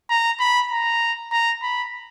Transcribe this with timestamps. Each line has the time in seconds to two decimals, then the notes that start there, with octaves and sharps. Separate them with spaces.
0.10 A#5
0.40 B5
0.71 A#5
1.32 A#5
1.63 B5